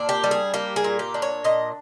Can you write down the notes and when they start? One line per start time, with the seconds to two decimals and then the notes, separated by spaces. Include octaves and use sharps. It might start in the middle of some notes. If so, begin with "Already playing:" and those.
Already playing: A#2 D4
0.09 G4
0.24 G3
0.31 G#4
0.54 A#3 G4
0.76 G#4
0.84 A#2
0.99 G4
1.14 D4
1.22 C#5
1.44 A#2 D#5